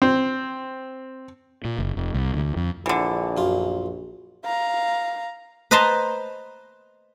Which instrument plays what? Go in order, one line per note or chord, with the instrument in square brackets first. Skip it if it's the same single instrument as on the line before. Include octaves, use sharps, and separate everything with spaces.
[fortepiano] C4
[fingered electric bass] A#2
F#1
F1
C2
D2
F2
[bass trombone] A#1 [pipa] D3 E3
[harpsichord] F#2 F4
[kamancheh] F5 A#5
[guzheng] B4 C5 D#5 A5 A#5 C6